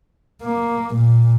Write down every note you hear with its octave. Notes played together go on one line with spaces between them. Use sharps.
A#3
A#2